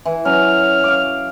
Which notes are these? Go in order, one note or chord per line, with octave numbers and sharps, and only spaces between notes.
E3
F#3 C#4 F6
F5 D6